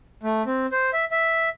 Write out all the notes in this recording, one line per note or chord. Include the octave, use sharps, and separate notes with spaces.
A3
C4
C5
E5
E5